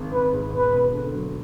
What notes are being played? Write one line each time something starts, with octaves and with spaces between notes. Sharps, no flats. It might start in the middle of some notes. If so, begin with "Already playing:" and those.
Already playing: G#1 G#2
G#1 B4
G#2
E1 B4
E1
D3
F#3